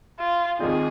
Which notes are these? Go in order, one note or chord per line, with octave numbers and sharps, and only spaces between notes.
F4
D#2 D#3 G#3 C4 F4 G#4